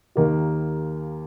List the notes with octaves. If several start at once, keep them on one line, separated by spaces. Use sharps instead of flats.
D#2 D#3 A#3 G4